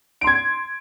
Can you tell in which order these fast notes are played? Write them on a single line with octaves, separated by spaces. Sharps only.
D7 C6 G#6